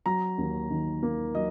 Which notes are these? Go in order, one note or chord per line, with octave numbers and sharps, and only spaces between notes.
F#3 A#5
D#2
D#3
A#3
F#3 D#5